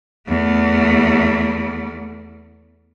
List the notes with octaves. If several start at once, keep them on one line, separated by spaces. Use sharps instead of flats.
E2 A3